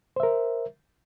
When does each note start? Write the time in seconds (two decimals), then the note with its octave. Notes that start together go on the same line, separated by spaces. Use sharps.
0.16 C5
0.20 E5
0.23 A#4